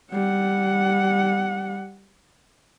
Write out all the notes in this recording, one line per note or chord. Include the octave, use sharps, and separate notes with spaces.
G3 F#5